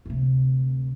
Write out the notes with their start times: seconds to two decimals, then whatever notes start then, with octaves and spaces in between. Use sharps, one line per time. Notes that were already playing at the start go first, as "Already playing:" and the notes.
0.06 D2 C3